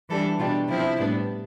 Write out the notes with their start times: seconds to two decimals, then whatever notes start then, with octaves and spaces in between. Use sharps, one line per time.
0.09 E3 G3 D4 A4
0.39 B2 G3 D4 F4
0.68 C3 F3 C4 E4
0.99 A2 G3 B3 D4